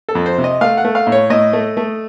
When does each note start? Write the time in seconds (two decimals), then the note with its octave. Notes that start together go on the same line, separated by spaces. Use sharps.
0.09 A4
0.15 F2
0.26 C5
0.38 C3
0.44 D#5
0.61 A3 F5
0.77 F#5
0.84 A3
0.95 F5
1.07 A2
1.12 C#5
1.30 A2 D#5
1.53 A3
1.77 A3